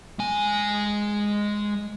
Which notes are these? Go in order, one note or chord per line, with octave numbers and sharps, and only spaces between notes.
G#3 G#5